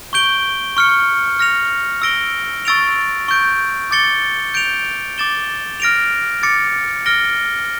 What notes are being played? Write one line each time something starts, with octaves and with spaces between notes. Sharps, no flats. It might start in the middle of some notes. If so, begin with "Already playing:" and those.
C#6 G6 D7 G7
C#6 F6 C#7
F6 A#6 C#7 F7
E6 A#6 D7 G7
C#6 E6 A6 D7 F7
C#6 G6 D7
D6 A6 C#7 G7
G6 D7 F7
D6 A6 E7 G7
F6 A#6 D7 F7
D6 A6 C#7
F6 A#6 D7 G7